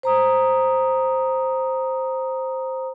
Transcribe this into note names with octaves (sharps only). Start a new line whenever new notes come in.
C5 A#5 D#6